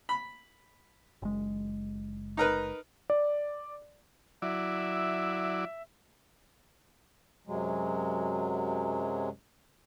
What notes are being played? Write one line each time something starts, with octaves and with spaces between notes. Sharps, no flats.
B5
F#1 G#3
D#4 A#4 B4
D5
F#3 E4 D5 E5
F#2 C3 F#3 G#3